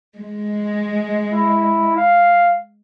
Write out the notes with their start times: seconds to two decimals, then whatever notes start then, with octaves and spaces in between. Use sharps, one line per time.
0.16 G#3
1.32 E4
1.97 F5